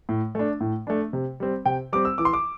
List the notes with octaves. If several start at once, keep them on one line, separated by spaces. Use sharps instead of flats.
A2
A3 D4
A2
A3 D4
C3
G3 C4
C3 G5
G3 C4 D6
E6
E3 D6
C6
D6